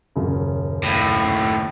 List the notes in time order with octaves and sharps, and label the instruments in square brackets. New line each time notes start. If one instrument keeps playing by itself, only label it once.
[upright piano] D#1 F#2 C#3
[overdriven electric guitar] D#2 A2